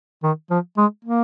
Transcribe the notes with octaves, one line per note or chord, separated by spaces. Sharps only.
D#3
F3
G#3
A#3